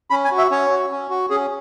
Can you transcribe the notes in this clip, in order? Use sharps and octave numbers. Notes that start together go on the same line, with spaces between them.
C#4 B5
G#5
F#4
E5
C#4 C#5
F#4
C#4
F#4
C#4 G#4